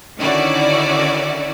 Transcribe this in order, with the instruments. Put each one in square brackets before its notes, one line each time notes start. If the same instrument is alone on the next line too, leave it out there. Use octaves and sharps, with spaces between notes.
[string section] D3 D#3 C#4 E4 F#4 D5